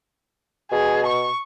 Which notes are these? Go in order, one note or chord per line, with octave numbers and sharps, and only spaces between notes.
B2 G#4
C#6